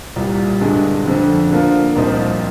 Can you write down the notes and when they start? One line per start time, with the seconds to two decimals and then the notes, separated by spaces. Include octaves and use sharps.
0.16 C2 A#2 G3
0.61 G2 D3 G#3
1.06 F2 D3 F3
1.51 D3 F3 A#3 F4
1.96 C2 A#2 F3 C4 D#4